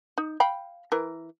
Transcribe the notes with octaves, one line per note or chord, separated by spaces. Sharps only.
D#4
F5 G5 B5
E3 A#4